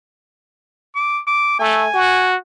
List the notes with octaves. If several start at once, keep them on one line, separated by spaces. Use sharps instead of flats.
D6
D6
A3 G#5
F#4